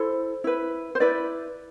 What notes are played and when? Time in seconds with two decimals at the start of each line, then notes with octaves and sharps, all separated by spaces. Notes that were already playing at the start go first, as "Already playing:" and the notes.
Already playing: E4 A4 C5
0.44 E4 B4
0.95 C5
1.00 E4 B4 D5